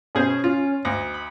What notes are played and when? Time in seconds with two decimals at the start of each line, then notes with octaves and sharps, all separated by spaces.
0.15 B2 C#4 G#4 C5
0.44 F4
0.85 D2 D#5
1.14 B5